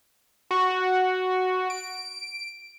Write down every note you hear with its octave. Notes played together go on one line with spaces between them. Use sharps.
F#4
D7